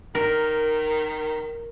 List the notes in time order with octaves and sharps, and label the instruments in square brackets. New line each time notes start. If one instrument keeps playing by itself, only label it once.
[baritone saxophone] D#3 [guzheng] A#4